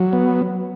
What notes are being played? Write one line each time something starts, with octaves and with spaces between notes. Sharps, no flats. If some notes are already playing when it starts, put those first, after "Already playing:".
Already playing: F#3
B3